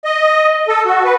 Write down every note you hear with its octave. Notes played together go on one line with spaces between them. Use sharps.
D#5
A4
F#4
B4